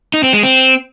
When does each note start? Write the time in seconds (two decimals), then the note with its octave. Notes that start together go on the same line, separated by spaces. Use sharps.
0.14 D#4
0.24 C4
0.33 G#3
0.43 C4